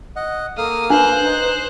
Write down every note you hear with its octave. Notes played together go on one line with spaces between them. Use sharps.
D#5 F#5
A#3 A4 F5 D#6 F6
D4 B4 C5 F#6
D#4